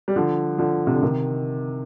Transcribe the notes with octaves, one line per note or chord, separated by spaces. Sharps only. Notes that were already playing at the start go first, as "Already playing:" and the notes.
G3
D3 F3
D3 F3
C3
D3
C3 D#3